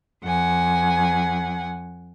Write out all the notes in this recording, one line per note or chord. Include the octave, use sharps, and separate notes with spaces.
F2 F#5 G#5